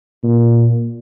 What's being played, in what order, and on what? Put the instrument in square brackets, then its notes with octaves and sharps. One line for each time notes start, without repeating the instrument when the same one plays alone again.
[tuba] A#2